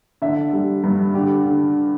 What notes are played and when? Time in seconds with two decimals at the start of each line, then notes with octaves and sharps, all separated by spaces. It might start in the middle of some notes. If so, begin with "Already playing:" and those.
0.22 D3 E5
0.53 G3
0.84 G2
1.14 D3 G4
1.46 D3